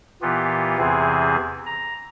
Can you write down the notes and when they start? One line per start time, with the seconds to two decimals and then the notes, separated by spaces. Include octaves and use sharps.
0.22 A#2 E3 B3 F4 G4
0.78 E2 C3 E3 C4 G#4
1.66 A#5